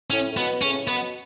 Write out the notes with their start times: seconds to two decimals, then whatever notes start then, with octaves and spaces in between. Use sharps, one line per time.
0.10 A2 C#4
0.32 A2
0.36 B2 B3
0.62 A2 C#3 C#4
0.84 A2
0.88 B2 B3